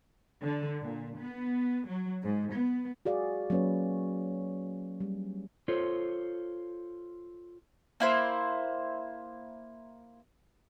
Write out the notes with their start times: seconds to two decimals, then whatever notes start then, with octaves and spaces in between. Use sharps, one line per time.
0.41 D3
0.81 A#2
1.19 B3
1.88 F#3
2.23 G#2
2.54 B3
3.05 F#4 G#4 D5 F5
3.50 F#3 A#3 C#4 B4 C#5
5.01 G3
5.68 F4 A4 C5 C#5
8.00 A#3 E4 C5